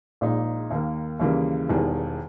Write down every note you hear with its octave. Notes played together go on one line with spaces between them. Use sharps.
A#1 A#2 G#3 D#4
D#2 D#3 A#3
D#2 C#3 E3 G3 A#3
E1 E2 D#3 G3